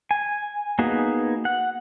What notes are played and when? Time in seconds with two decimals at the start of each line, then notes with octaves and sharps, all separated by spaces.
0.11 G#5
0.79 A#3 B3 D#4 F#4 G#4
1.45 F#5